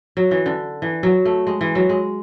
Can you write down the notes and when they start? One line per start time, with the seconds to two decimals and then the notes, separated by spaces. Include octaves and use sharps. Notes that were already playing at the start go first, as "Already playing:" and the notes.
0.17 F#3
0.31 E3
0.46 D3
0.82 E3
1.03 F#3
1.25 A3
1.47 G#3
1.61 E3
1.75 F#3
1.89 G#3